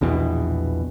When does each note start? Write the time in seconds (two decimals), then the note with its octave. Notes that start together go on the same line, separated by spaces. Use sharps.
0.01 A#1 E2 B2 E3